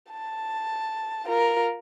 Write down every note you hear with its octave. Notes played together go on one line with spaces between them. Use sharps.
A5
F4 A#4